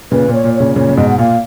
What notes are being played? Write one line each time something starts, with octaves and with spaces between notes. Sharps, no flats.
A#2 C#3 B4
A#2
C#5
A#2
C#5
A#2 C#3
A#2 C#3 C#5
C#3
G#2 B2 D#5
F#5
A#2 F5